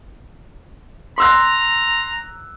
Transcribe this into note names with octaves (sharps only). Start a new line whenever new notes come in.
A#5 C6 E6 F#6